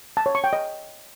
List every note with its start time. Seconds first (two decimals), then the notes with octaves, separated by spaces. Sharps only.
0.17 A5
0.26 C#5
0.35 C#6
0.44 G5
0.53 D#5